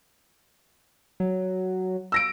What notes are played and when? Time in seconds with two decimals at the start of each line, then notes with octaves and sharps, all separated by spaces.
1.20 F#3
2.12 E6 A#6 D7